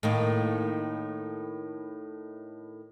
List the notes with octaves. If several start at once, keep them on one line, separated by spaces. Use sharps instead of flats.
A2 D#3 A#3